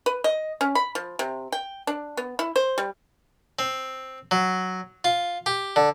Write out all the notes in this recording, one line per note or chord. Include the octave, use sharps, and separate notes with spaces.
B4
D#5
C#4
B5
F3
C3
G5
D4
B3
E4
C5
G3
C4
F#3
F4
G4
D3